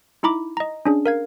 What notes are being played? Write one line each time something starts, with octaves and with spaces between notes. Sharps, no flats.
D#4 E4 A#5 B5 D6
D#5 A#5
C#4 D4 G#4
A#4 F5 G#6